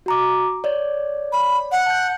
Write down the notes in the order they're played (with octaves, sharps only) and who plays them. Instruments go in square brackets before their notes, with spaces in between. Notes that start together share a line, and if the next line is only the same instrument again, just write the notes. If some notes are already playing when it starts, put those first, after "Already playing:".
[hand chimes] F#4 A#5 D6
C#5 D5
[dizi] B5
F#5
[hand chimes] A5 G6